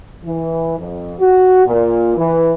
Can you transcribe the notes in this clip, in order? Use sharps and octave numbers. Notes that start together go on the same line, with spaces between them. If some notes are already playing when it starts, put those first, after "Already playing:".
E3
F2
F#4
A#2
E3